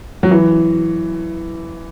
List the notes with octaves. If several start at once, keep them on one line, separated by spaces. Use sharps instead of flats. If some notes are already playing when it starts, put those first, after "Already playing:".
F#3
E3